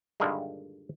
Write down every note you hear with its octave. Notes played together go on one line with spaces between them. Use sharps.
G2 A#2 D3 D#3 G3 G#3